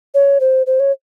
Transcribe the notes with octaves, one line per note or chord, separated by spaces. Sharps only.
C#5
C5
C5
C#5